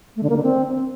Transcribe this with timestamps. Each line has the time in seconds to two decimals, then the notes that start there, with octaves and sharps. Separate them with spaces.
0.16 A3
0.23 D3
0.30 A#3
0.36 D3
0.43 C4